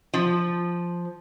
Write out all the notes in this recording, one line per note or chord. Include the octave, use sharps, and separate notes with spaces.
F3